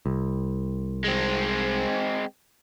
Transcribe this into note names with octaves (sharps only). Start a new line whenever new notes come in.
C2
G#3 C4